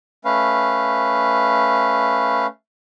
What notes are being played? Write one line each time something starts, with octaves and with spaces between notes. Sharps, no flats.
A3 C#4 B4 F5